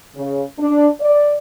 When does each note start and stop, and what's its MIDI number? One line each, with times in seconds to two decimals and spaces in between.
0.16 0.44 49
0.59 0.88 62
1.01 1.35 74